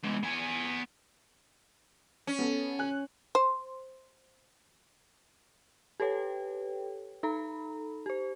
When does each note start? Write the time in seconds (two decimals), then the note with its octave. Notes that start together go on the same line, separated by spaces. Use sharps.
0.04 G#3 B3
0.23 B3 G#5
2.27 C#4
2.39 B3 A4
2.79 G#5 F#6
3.35 C5
6.00 G4 A4 B4 C#5 G5
7.23 D#4 A4 A#5 B5
8.06 G4 C5